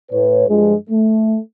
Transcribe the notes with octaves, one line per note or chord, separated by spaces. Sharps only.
A2 B4 C#5
G2 F3 G#3
A3